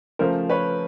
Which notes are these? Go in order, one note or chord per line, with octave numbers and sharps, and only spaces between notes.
C#3 F3 A3 A#4 C5
B4 C#5